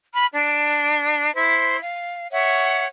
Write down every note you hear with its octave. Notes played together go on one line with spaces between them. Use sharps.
B5 F6
D4
E4 C5
F5
C#5 E5 F#5